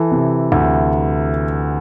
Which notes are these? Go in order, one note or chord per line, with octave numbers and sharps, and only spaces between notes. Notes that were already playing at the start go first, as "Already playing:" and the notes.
Already playing: E3 A4
C3
D2